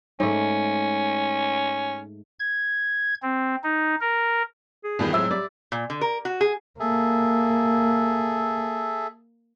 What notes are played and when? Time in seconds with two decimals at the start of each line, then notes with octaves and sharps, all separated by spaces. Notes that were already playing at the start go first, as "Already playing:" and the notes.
0.20 G#2 A3 C#4
2.39 G#6
3.22 C4
3.64 D#4
4.01 A#4
4.84 G#4
4.99 E2 G2 D#3 F4 G4
5.13 A2 F#3 G#3 C4 E5 E6
5.31 G3 D5
5.72 A#2
5.90 D3
6.01 A#4
6.25 F#4
6.41 G#4
6.80 A#3 G#4 A4 E5